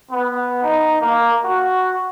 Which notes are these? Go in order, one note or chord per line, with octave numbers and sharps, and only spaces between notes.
B3
D#4
A#3
F#4